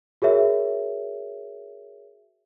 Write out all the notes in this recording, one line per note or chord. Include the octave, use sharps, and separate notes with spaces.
F#4 G#4 A#4 C#5 E5